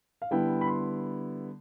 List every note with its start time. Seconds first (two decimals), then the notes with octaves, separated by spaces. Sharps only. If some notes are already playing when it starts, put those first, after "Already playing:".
0.22 F5
0.31 D3 G3 B3 E4 G5
0.61 B5
0.68 C6